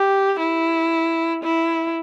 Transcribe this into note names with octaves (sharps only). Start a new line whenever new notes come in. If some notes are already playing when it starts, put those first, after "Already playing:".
Already playing: G4
E4
E4